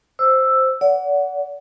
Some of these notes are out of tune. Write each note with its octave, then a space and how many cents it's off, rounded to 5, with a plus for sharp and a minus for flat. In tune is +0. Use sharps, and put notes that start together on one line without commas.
C5 +0 E6 +5
D5 -40 F#5 +0